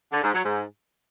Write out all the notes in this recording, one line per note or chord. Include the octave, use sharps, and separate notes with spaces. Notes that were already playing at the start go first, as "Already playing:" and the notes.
D3
G#2
F#3
G#2